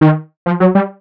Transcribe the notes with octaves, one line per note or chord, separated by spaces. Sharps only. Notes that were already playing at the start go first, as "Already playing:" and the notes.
D#3
F3
F#3
G3